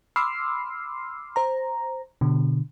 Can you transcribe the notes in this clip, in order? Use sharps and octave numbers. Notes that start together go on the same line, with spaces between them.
B5 C6 D6 E6 F6 C7
C5 A#5
B2 D3